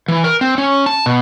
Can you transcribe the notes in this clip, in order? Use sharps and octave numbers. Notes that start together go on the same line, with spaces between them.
E3
A#4
C4
C#4
A5
B2